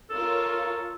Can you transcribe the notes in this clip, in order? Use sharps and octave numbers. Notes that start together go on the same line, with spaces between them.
F4 A4 A#4 C#5